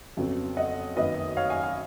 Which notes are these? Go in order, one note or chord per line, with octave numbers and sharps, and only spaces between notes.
F2 C#3 F#3 B3
D#5 F#5
F#2 D#3 A#3 B4 D#5
C#5 F5
F5 G#5
F5 G#5